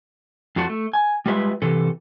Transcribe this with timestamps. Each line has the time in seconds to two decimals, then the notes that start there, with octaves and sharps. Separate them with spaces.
0.56 F2 F4 F#4 A5
0.70 A3
0.93 G#5
1.26 G3 G#3 F4 B4 E5
1.62 C3 E3 A4